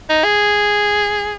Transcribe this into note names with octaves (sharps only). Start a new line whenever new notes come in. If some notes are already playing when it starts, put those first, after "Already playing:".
D#4
G#4